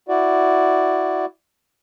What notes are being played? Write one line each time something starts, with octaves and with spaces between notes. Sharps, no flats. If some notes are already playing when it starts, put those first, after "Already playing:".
E4 F#4 D5